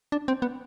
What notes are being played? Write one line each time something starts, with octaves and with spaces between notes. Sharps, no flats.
D4
C4
B3